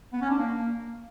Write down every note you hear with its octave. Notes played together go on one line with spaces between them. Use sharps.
B3
C#4
D4
A#3